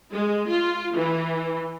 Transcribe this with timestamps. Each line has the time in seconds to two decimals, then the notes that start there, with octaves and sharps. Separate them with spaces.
0.12 G#3
0.48 F4
0.96 E3